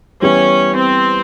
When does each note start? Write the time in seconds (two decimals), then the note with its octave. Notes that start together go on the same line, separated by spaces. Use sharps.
0.22 E3 G3 B3 C#4 E4 G4
0.77 C4